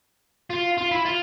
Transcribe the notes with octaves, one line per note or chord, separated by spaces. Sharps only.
F4
F4
E4
F4